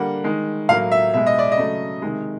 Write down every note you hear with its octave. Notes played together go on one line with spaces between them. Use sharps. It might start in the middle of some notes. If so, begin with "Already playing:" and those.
Already playing: D3 G3 A#3 F#5
D#3 G#3
A2 F#3 A#3 F5
E5
B2 G#3 E5
D#5
D5
D#5
C#3 F#3 A3
C3 D#3 G#3